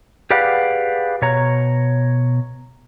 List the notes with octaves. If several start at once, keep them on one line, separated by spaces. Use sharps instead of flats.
G4 G#4 B4 D5 F5 F#5
B2 C#5 A#5